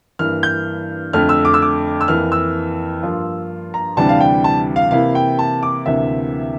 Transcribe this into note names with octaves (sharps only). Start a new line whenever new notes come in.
G2 E3 A#3 F6
G6
F2 D3 A3 F6
E6
D6
E6
D6
E6
F2 E3 A#3 F6
E6
G2 F3 A#3 F4
A#5
D2 C3 E3 G3 D4 A5
F5
G5
A5
F5
C3 E3 A#3 E4 F5
G5
A5
D6
D2 C3 E3 A#3 E5